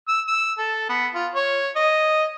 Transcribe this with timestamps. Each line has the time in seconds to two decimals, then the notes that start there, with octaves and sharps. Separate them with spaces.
0.08 E6
0.28 E6
0.59 A4
0.90 B3
1.15 F4
1.35 C#5
1.76 D#5